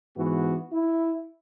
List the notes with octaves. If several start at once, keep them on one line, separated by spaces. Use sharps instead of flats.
G#2 E3 B3 F#4
E4